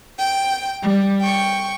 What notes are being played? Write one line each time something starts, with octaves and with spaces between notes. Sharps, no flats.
G5
G3
G5 C#6